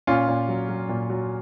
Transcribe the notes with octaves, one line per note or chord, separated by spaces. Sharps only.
A#2 C#4 F4
A#2
F#3
F#3
A#2
F#3